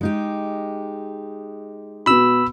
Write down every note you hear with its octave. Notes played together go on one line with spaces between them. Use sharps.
G#3 D#4 G4
B2 B3 B5 E6